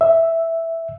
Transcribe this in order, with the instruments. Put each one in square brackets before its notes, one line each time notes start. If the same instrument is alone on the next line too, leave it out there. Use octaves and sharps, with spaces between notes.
[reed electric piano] E5